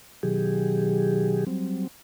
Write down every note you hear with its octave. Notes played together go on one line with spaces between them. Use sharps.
B2 D#3 F#3 G4 G#4
F#3 G3 C4